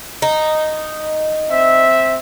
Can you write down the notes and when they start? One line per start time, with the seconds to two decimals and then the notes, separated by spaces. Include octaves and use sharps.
0.22 D#4
1.50 C4 E5